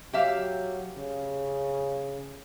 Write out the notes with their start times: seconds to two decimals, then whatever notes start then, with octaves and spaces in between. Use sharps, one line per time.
0.13 F#3 G4 E5 F5
0.98 C#3